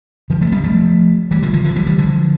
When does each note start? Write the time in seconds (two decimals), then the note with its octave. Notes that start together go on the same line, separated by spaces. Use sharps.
0.30 D3 F3
0.41 F3 A3
0.52 G3 B3
0.64 F3 A3
1.31 E3 G3
1.42 D3 F3
1.53 D3 F3
1.64 D3 F3
1.76 E3 G3
1.86 E3 G3
1.98 D3 F3